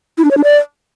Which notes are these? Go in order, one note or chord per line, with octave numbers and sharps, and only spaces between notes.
E4
D4
C#5
D4
D5